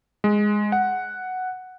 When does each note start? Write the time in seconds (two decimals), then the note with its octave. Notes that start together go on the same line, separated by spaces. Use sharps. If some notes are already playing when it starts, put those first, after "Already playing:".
0.24 G#3
0.72 F#5